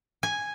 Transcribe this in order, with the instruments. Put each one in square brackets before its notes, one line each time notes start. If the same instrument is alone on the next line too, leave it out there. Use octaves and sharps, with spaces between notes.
[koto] G#5